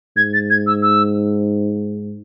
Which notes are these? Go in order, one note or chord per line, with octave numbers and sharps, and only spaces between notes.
G#2 G#6
A6
G#6
E6
E6